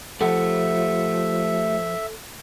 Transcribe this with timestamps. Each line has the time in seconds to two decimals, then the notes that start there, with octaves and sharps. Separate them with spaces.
0.21 F3 A3 G4 A4 E5 F#5